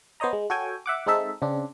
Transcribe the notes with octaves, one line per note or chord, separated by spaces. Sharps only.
B3 C5 C#5 D#5 A#5
G#3
F#4 A4 C#5 G5 G#5
E5 F#5 D6
G#3 C4 D#4 A4 E5
C#3 C4 D4